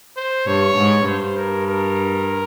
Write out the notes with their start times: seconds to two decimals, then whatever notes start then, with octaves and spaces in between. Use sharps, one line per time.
0.16 C5
0.46 G2 C#5
0.77 G#2
1.06 G2 C5
1.37 A#4
1.67 A#4